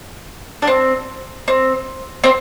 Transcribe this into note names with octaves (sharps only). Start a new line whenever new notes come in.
D4
C4
C4
C4